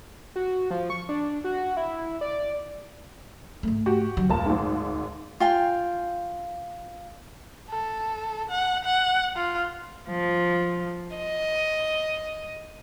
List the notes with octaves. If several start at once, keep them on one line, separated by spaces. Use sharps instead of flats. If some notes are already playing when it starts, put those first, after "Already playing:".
F#4
F3
C#6
D4
F#4
E4
D5
G#2 A3
F#4 G4
D3 F#3
F1 D2 A#2 A5
G#1 G#2
F4 G5 G#5
A4
F#5
F#5
F4
F3
D#5